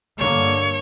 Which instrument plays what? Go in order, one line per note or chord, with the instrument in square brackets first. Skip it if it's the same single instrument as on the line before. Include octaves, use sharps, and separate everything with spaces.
[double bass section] G2 D3 A#3 [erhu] C#5